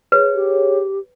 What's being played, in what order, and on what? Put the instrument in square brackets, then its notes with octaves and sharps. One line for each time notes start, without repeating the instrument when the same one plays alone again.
[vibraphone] G#4 C#5 [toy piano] B4
[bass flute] G4